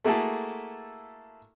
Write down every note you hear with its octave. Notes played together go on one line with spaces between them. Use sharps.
A3 A#3 E4 F#4 G#4 A4